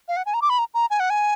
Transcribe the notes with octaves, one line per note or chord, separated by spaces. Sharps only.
F5
F#5
G#5
A#5
D6
B5
A#5
A#5
G#5
F#5
G#5